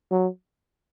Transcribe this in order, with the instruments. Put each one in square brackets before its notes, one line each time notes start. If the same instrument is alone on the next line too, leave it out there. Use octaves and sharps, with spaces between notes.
[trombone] F#3